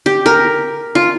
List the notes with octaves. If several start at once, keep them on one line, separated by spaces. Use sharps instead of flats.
G4
A#4
F4